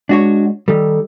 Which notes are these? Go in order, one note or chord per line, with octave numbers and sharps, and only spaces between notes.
G#3 D4 F#4 C#5
D#3 G3 A4